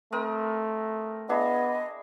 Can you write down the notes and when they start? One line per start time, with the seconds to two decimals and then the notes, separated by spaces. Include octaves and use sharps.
0.12 A3 C4 A#4 D#5
1.29 B3 D4 E4 G#4 D#5